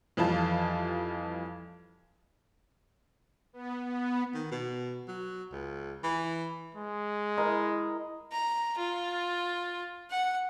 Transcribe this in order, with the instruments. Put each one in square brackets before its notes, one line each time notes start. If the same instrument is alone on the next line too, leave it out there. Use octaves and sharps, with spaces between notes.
[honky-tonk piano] F2 E3 G3 F4 A5
[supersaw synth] B3
B3
[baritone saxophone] D#3
B2
F#3
C#2
E3
[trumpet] G#3
[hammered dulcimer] E4 A#4 D#5
[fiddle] A#5
F4
F#5